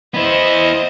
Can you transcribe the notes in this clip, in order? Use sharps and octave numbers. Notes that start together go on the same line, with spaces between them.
B3 E4 C5 D#5